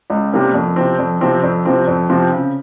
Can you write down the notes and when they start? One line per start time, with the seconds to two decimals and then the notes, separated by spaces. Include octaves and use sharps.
0.10 C#2
0.32 C3 G3 A#3 C#4
0.54 F2
0.76 C3 F3 C4
0.99 F2
1.21 C3 F3 C4
1.43 F2
1.65 C3 F3 C4
1.87 F2
2.10 C3 F3 C4
2.32 C#3